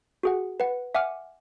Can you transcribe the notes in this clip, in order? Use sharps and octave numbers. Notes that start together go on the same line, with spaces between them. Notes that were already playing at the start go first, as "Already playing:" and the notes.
F#4 G#4 F#5
B4 F#5
E5 F#5 G#5 D6 F6